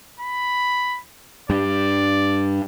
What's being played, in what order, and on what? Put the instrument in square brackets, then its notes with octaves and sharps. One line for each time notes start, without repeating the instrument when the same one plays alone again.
[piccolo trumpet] B5
[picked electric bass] G2 [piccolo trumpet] D5